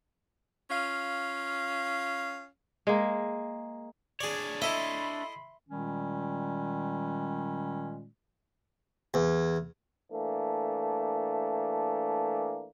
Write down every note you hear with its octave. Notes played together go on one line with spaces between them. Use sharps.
C#4 F4 F5
G#3 A#3
D4 G#4 C#5 D5
E4 A4 D#5 E5 B5 C6
A#2 D#3 G3 G#3 C#4
E2
E3 A3 A#3 D4